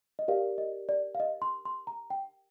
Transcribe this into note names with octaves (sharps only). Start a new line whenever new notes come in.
D#5
G4 A#4 D5 F5
D#5
D5
F5
D#5
C6
C6
A#5
G5